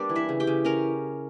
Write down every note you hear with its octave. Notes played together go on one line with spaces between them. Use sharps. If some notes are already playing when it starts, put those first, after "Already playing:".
Already playing: G3 A#3 B3 D4 D5
E3
E4 E5
C#3
G4 G5
C#3
C#4 A#4 A#5